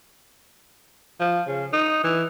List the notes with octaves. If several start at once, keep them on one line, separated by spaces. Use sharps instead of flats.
F3
C#3
D#4
E3